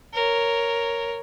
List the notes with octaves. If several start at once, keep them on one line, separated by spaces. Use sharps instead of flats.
A#4 C#5